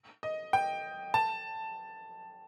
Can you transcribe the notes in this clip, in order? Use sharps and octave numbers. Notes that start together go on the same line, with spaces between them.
D#5
G5
A5